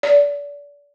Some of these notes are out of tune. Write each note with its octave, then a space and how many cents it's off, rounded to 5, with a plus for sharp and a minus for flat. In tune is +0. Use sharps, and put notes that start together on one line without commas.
D5 -30